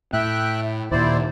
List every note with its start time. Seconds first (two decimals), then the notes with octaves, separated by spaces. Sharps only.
0.13 A2 E5 G5 F#6
0.91 D#2 A#2 E4 C5 D5